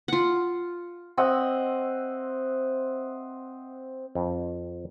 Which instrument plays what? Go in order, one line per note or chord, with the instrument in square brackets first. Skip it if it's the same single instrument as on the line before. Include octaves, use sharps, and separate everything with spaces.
[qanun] F4 F#5
[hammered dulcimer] C4 D#5 E5 F#5
[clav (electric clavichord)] F2